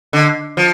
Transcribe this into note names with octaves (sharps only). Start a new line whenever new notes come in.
D3
F3